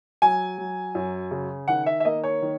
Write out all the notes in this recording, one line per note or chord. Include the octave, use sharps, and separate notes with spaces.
F#3 G#5
F#3
F#2
C#3
D#3 F#5
E5
E5
A#3 D#5
C#5
D#3